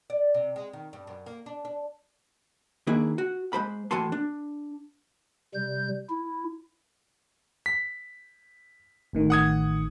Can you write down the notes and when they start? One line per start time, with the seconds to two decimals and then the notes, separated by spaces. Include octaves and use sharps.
0.10 D5
0.34 C3
0.56 G#3
0.73 D#3
0.93 G2
1.07 F#2
1.26 A#3
1.46 D4
1.65 D4
2.87 D#3 A#3 D4 E4 G#4
3.18 F#4
3.53 G#3 C5 B5
3.91 A2 E3 F#4 G#5 A5 C6
4.12 D4
5.54 C3 G3 G6
6.10 E4
7.66 B6
9.13 A1 A2 D#3
9.30 F#5 D#6 G#6